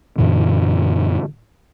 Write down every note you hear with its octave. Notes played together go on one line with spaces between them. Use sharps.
F#2 A#2 D3 E3